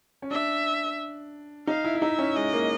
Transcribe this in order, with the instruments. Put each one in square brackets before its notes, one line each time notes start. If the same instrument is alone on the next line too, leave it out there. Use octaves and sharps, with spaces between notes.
[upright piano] C#4
[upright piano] D4 [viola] E5
[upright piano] D#4 [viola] F5
[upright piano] E4
E4
[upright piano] D#4 [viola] E5
[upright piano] C#4
[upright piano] G#3 [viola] D#5
[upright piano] A#3